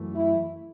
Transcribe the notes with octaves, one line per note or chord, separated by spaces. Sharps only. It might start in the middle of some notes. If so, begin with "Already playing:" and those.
Already playing: F#2 E3 A3
E4